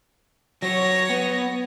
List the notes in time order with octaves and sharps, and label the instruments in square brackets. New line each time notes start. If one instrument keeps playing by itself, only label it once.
[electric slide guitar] F#3 [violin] C#5 A#6
[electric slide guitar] B3